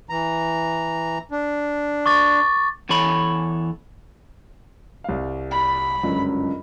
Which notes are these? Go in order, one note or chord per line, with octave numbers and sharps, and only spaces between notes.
E3 A#5
D4
C#6 D6 A6
E2 E3 A4 C#5 B5
C2 F5
B5
G1 C#2 F#2 F#3